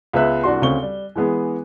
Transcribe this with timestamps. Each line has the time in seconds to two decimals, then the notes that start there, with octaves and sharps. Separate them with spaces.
0.13 C#2 G#3 B3 B4 E5 F#6
0.44 C2 D4 F#4 C6
0.62 D2 C#3 C4 C#6 G7
0.82 G3
1.16 E3 G#3 B3 G#4